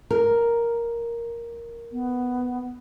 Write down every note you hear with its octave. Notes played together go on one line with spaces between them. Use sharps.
A#4
B3